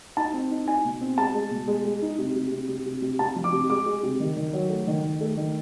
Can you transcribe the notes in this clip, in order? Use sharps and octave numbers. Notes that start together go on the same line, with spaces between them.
D#4 A5
C4
D#4
D#4 G#5
B2
C4
G#3 A5
G#3
B2
G#3
G#3
D#4
C3
C3
C3
C3
C3
C3
C3 A5
F3
D6
C3
G#3 D6
G#3
C3
D#3
D#3
F#3
A3
D#3
D#3
A3
D#3